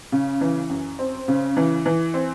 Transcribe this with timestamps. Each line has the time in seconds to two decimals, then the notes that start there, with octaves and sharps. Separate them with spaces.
0.12 C#3
0.41 E3
0.69 F#2
0.99 C4
1.28 C#3
1.57 E3
1.86 E3
2.14 C4